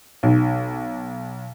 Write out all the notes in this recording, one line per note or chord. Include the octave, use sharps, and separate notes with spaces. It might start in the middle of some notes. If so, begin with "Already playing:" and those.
B1